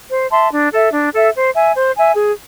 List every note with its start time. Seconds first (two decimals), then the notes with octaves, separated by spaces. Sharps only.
0.10 C5
0.31 E5 A5 C6
0.52 D4
0.73 A4 E5
0.93 D4
1.13 A4 E5
1.34 C5
1.55 E5 G#5
1.75 C5
1.96 E5 G#5
2.16 G#4